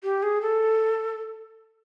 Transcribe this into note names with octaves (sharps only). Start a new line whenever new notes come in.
G4
G#4
A4